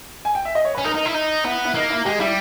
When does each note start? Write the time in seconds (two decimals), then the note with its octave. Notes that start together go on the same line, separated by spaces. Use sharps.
0.25 G#5
0.35 G5
0.45 E5
0.55 D#5
0.65 C#5
0.75 B4
0.78 C#4
0.85 D#4 A#4
0.95 D#4
1.06 E4
1.15 D#4
1.45 B3 E4
1.65 E4
1.74 A#3 D#4
1.90 E4
2.05 G#3 G4
2.20 G3 E4